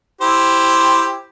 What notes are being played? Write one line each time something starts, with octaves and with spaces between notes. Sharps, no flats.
E4 G4 C5